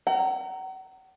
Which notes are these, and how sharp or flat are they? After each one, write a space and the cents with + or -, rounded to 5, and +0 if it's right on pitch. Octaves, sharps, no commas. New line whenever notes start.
F#5 +40 A#5 -15